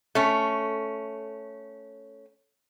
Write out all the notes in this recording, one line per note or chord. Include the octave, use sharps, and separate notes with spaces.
A3 C#4